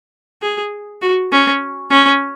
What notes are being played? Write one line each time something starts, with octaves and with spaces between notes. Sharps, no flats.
G#4
F#4
C#4
C#4